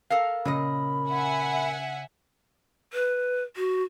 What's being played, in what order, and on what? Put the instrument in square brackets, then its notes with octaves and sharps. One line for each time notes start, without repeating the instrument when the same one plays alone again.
[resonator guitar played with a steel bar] A4 A#4 F5
[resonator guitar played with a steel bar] A#2 A#4 D#5 [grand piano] C#3 [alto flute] B5
[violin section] E5 F#5 G#5
[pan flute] B4
F#4